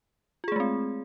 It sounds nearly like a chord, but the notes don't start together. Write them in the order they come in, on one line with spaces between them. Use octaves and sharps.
F4 G#4 A3 G#3 C4